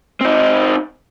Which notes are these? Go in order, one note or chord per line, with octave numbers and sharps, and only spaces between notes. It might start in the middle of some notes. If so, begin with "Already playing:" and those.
C4 D#4